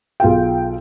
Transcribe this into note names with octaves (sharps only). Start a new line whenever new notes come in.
B1 F4 G#4 G5